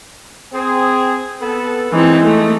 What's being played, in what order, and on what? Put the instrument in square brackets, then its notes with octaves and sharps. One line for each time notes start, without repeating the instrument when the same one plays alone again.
[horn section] C4 G#4
B3 A4
[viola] E3 C4 [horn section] G#3 D#4
[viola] A3